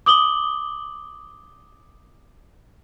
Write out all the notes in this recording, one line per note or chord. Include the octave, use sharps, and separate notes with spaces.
D6 D#6 F#7 G7